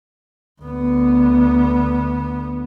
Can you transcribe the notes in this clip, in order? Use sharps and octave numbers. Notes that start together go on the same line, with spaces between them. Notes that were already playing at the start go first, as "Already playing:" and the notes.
D2 B3